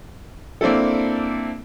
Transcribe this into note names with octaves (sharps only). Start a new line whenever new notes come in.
A#3 C4 D4 E4 A4